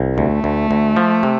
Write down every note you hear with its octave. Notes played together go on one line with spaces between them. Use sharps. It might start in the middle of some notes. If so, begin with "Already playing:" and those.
Already playing: C2
D2 A3
D2
D2
F3
C3